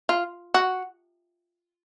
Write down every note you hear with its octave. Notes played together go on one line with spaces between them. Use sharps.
F4
F#4